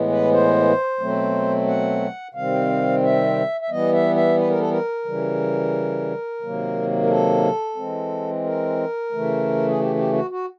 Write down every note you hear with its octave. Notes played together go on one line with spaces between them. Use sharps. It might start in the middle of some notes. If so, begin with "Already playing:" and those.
Already playing: A2 E3 G#3 B3
B4
C5
B2 F#3 A3 C4
F#5
C3 D#3 G3 C4 F5
E5
E5
E3 G3 B3 D#5
E5
E5
B4
A#4
A4
A#4
C#3 E3 G3
C3 D#3 F#3 A#3
A#4
A4
E3 G#3 C4
A#4
C#3 E3 A3
G#4
G4
G4
F#4
F#4